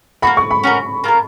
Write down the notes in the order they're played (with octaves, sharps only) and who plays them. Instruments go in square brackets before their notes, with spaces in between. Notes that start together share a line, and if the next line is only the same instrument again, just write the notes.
[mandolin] A#3 D#4 F#4 [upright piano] B5
[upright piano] C#6
B5
[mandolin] C#4 F#4 A#4
A#3 F4 A#4